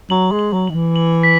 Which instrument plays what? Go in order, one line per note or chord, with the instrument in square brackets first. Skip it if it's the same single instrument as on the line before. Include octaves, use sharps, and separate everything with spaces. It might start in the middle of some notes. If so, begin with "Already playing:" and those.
[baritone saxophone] F#3 [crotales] F#7
[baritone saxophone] G#3
[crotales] F#7
[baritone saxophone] F#3
[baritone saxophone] D#3 [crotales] F#7
[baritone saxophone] E3
[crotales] F#7
B6